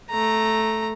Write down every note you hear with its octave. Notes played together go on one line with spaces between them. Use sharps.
A3 A#5